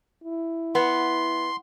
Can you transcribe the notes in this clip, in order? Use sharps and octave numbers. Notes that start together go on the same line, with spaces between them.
E4
B3 C6